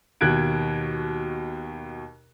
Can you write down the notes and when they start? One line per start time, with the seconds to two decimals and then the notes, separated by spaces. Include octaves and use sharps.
0.21 D#2 B2 F#6 G#6 D7